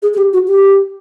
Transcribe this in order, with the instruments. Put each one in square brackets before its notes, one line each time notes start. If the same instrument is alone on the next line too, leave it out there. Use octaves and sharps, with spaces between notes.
[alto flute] G#4
G#4
G4
F#4
G4